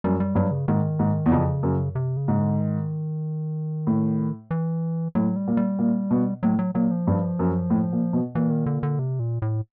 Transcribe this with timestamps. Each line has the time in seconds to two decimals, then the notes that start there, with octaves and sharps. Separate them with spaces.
0.04 F#2 G3
0.20 G3
0.35 G2 F#3
0.51 C#3
0.68 G#2 D#3
0.99 G#2
1.26 E2
1.32 F2 C#3
1.63 F#2
1.95 C3
2.17 C#3
2.28 G#2
2.39 D3
2.60 D#3
3.87 A2
4.51 E3
5.15 A2 F#3
5.36 G3
5.47 A#2
5.57 G3
5.79 A#2
6.11 B2
6.43 A2 F#3
6.59 F#3
6.74 A#2 F#3
6.91 F3
7.07 G2
7.39 F#2
7.70 A2
7.92 A#2
8.13 B2
8.35 A#2 E3
8.50 D#3
8.66 D3
8.83 D3
8.99 C3
9.19 A#2
9.42 A2